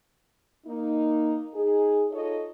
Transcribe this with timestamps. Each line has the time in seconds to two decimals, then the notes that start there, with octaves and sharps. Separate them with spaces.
0.66 A#3 D#4
1.54 D#4 G#4
2.11 D#4 F4 A4 C#5 D#5